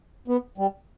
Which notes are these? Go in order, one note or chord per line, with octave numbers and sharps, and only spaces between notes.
B3
G3